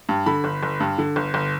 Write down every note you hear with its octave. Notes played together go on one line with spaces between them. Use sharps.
G2
D3 B5
G1
G1
G2
D3
G1
G1